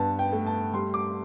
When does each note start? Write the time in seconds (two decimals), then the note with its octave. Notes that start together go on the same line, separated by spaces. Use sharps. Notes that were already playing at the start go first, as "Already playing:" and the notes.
Already playing: G2 B3 A5
0.19 G5
0.32 A3
0.46 A5
0.73 G3 C6
0.94 D6